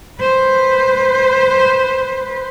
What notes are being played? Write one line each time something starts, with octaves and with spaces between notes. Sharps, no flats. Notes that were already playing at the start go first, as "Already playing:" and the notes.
B4 C5